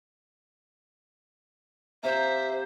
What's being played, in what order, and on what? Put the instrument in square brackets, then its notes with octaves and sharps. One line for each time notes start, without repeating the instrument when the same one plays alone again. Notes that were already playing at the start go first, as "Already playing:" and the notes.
[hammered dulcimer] C3 F5 A#5 [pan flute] C5 [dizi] E5